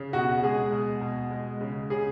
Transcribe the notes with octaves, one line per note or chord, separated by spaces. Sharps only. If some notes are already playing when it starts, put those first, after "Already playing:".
Already playing: C#3
B2 F#4
G#3 G#4
B2
B2
G#3
C#3
C#3 G#4